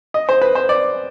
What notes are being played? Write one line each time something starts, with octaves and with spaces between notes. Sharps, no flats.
D#5
C5
B4
C5
D5